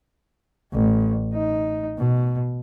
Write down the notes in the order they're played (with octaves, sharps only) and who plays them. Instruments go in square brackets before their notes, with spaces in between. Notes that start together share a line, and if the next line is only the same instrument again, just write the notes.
[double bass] A1
D#4
B2